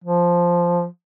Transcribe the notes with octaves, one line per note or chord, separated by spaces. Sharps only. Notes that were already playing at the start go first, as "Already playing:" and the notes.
F3